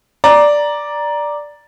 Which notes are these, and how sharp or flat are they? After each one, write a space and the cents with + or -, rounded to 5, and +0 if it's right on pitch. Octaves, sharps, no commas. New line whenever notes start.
D5 +0 A#5 +10